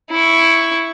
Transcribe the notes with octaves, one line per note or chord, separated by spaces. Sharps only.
E4 C#6